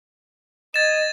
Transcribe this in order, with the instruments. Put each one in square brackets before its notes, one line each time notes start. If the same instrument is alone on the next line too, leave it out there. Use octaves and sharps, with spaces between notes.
[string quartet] D#5 [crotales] G#6 A6 E7